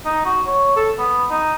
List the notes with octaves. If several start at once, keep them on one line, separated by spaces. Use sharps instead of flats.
D#4
F#4
C#5
A4
B3
D#4